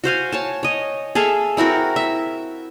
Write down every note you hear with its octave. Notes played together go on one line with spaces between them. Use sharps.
F#4 C5 F5 G#5
C#5 G#5 A5
C#5 D#5
G#4 A4 E5 F5
C4 E4 F#4 A#4
E5